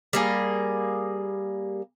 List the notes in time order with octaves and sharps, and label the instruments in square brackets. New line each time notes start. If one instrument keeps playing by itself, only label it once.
[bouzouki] G3 A#3 G#4